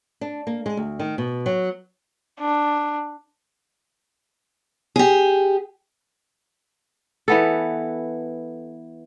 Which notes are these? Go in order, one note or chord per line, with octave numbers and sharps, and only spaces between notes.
D4
A#3
G#3
D2
D#3
B2
F#3
D4
G4 G#4
E3 B3 A4